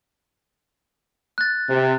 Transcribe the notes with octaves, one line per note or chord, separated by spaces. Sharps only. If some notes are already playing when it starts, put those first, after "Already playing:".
F#6 A6
C3